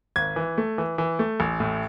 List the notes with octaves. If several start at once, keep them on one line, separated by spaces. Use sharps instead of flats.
G#1 G#6
E3
A3
E3
E3
A3
A1
A2